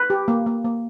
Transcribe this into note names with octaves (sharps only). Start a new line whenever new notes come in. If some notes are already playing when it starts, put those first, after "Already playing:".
Already playing: B4
G4
A#3
A#3
A#3